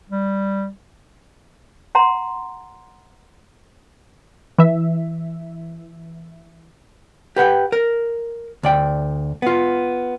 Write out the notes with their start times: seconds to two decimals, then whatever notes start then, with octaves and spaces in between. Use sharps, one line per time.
0.09 G3
1.95 F#5 A#5 C6
4.58 E3 E5
7.36 G4 B4 F#5 G5
7.72 A#4
8.63 D2 D5 G5
9.42 B3 F4